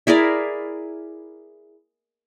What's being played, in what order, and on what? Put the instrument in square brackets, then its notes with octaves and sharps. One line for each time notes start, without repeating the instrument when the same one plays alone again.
[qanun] E4 G#4 A#4 D5